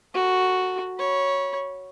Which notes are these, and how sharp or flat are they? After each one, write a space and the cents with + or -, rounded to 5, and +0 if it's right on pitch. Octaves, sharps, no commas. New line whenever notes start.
F#4 +0 A4 +35
C#5 +0 B5 -30